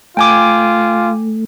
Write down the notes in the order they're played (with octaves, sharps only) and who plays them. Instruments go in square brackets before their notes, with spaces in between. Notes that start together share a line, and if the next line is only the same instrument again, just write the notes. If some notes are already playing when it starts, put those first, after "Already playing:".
[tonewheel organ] A3 [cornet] F4 [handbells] G5 G#5 D6